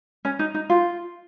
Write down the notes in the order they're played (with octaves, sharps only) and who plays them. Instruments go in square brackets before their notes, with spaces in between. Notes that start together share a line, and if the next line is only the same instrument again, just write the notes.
[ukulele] C#4
D#4
D#4
F4